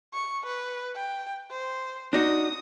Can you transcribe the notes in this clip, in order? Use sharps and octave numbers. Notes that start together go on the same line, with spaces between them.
C#6
B4
G5
C5
D4 D#4 F#4 D#6